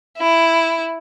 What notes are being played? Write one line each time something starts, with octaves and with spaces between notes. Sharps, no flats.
E4